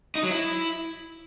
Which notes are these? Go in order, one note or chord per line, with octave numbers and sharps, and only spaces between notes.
D#4
F#3
E4